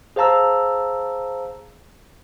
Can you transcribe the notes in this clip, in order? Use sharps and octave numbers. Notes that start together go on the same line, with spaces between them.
G#4 C5 F5 A5 A#5 E6